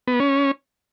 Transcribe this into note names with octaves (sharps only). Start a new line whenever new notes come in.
B3
C#4